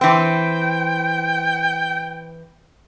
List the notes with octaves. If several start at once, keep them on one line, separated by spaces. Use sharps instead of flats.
E3 C4 G5